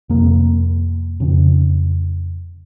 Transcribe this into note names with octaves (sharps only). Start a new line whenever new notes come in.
F2 C3 A#3
F2 C#3